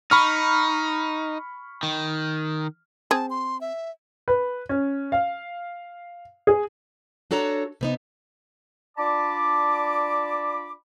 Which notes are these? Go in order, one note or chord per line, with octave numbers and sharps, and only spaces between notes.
D#4 B5 C#6 F6
D#3
C4 G#4 A5
C6
E5
B4
C#4
F5
G#4
D4 F#4 A4 C#5 A#5
C3 B3 D#4
D4 F4 D5 A5 B5 D6